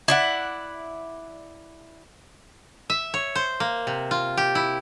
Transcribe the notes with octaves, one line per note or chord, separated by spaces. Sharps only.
E4 D5 F#5
E5
C#5
C5
A#3
C3
F4
G4
E4